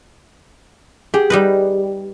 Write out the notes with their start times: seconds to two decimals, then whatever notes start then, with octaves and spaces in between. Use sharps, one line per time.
1.14 G4 G#4
1.30 G3 D#4 B4